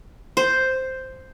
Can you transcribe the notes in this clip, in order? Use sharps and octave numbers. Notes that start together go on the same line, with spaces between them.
C5